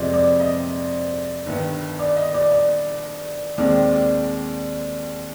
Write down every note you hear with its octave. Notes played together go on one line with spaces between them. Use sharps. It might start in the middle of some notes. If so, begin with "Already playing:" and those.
Already playing: F2 C3 F3 G#3 C5 D5 D#5
D5
D#5
G1 G2 D#3 B3
D5
D#5
D5
D5
D#2 D#3 G#3 C4 D5
D5
D5